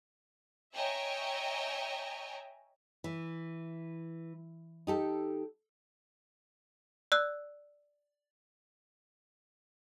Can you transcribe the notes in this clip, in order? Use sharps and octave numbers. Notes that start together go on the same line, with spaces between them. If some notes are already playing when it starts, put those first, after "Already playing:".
C#5 D#5 E5 G5 G#5 A#5
E3
D#4 G4 A4
D5 E6 F#6